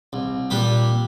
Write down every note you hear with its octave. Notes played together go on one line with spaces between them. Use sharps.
C2
A#2 G3 D4 G4